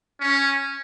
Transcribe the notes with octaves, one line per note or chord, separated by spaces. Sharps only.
C#4